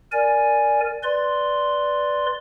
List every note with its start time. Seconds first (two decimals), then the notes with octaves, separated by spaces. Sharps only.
0.12 A#4 D5 G#5
1.03 B4 D5 C6